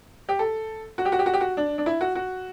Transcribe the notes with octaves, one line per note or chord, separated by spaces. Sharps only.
G4
A4
F#4
G4
F#4
G4
F#4
G4
F#4
D4
D4
E4
F#4
F#4